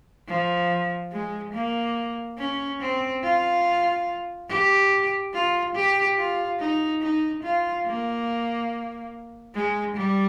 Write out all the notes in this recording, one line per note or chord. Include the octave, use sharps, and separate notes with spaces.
F3
G#3
A#3
C#4
C4
F4
G4
F4
G4
F4
D#4
D#4
F4
A#3
G#3
G3